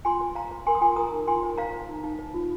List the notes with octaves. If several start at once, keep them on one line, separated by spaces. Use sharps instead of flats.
F4 G#5 C6
C5
C5 F5 A#5
C5
A#4 G#5 C6
D#6
F4 G#5 C6
A#4 A#5 D#6
D#4
F4 G#5 C6
C5
C5 F5 A#5
C5
D#4
D#4
C5
F4